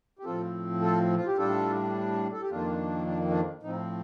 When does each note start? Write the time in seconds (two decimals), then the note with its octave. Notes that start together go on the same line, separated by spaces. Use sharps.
0.19 G4
0.24 A2 F3 C4 F4 A4
0.81 F4 A4
1.16 F4
1.26 G4
1.38 A2 G3 D4 F4 A4
2.33 A4
2.41 G4
2.50 F2 D#3 A#3 D4 F4
3.06 D4
3.30 D4
3.63 A2 F3 C4 D#4